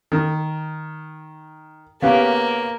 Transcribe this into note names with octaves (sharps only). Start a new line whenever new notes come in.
D#3
C#3 A#3 B3 G4